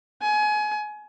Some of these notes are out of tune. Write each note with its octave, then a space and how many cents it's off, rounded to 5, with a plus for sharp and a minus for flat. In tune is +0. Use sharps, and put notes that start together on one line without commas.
G#5 +30